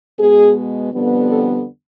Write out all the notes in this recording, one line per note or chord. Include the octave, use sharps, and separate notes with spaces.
B2 G#3 B3 G#4
F2 D3 G3 B3
A4